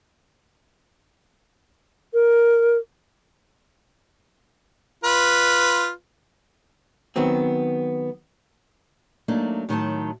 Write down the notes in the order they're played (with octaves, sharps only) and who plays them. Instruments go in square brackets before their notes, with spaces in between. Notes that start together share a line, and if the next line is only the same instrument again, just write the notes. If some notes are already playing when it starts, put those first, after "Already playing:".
[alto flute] A#4
[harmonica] F4 B4
[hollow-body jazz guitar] D#3 F#3 B3 C4
[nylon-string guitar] F#3 A3 A#3 D4 D#4
A2 D#3 F#3 A5